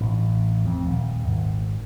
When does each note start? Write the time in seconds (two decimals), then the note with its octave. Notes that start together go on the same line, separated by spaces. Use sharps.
0.01 A1
0.65 F2
0.86 D#1
1.25 G#1